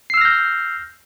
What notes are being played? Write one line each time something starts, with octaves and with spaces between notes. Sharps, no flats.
E6 F6 G6 A#6 C7